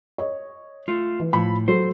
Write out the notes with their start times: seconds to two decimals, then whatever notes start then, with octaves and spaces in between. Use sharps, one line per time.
0.18 C#5 D#5
0.88 A3 F4
1.20 E3
1.33 A2 F3 B5
1.68 F#3 A4 C5